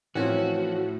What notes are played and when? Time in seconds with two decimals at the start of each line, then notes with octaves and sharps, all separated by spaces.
0.15 A2 E3 F3 C4 C#4 F#4